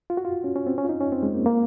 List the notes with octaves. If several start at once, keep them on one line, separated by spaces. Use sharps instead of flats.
F4
F#4
F4
C#4
C#4
C4
C#4
F4
D#4
C#4
C4
G#3
A#3
A#3